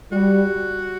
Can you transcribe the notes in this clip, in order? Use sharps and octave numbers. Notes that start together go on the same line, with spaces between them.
G3 F#4